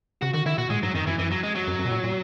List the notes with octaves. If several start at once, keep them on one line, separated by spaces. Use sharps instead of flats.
C#3 F#4
D#3 F#4
D#3 E4
B2 F#4
A#2 G#3
G#2 F#3
F#2 D#3
F#2 E3
F#2 E3
F#3
G#3
F#3
F#2
F#2
B2
A#2
A#2